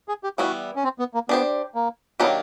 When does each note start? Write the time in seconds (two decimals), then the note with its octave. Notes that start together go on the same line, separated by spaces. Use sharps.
0.08 G#4
0.24 G4
0.38 E3 G3 B3 E4 F#4
0.76 C#4
0.84 C4
0.99 B3
1.14 A#3
1.29 B3 D4 G4 C5
1.75 A#3
2.20 D#3 F#3 A#3 B3 D4 G4